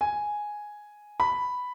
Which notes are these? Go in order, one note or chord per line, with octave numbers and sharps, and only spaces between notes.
G#5
B5